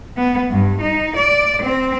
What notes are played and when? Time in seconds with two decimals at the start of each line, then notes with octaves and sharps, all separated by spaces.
0.17 B3
0.50 G2
0.81 D#4
1.16 D5
1.62 C4